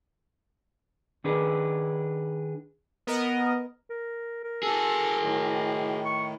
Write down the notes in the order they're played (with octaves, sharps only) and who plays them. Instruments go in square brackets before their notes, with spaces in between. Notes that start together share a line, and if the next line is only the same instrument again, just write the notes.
[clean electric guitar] D#3 D4 G#4 B4
[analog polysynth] B3 A#4 D#5
[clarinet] A#4
A#4
[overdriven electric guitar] F#4 G#4 [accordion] A4
[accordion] A2 D#3
[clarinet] C#6